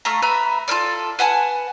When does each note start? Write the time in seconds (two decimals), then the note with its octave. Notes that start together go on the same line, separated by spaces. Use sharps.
0.05 A3 F4 A#5
0.22 B4 E5 A#5 B5
0.68 F4 A4 A#4 D5
1.19 B4 F#5 G#5 A5